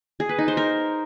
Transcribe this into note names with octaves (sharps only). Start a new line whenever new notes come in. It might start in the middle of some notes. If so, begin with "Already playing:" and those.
G#4
B4
D#4
C5
A#4